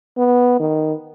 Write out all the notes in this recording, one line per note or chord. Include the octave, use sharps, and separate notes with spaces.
B3
D#3